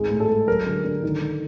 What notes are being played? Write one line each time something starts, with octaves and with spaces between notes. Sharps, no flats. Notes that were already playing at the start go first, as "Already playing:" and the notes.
Already playing: G#1 G#3
A2
A4
G#3
F#3 A#4
D3
D3
D#3
D#3